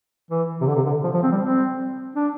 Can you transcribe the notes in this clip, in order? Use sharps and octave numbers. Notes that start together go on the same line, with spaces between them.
E3
C3
D3
C3
D3
F3
F3
C4
G3
C4
D4